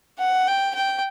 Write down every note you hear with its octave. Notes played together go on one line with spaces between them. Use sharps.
F#5
G5
G5